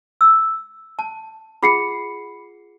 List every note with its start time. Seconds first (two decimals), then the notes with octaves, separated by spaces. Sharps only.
0.21 E6
0.99 A5
1.63 F4 G#4 F#5 B5 C7 C#7